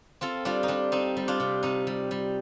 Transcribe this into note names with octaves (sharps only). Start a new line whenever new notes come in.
C4 F4 A4
G3 D4 F4
D#4
G3 D4
C4 D#4
G3
D4 F4
C3
C3 D#4
G3
G3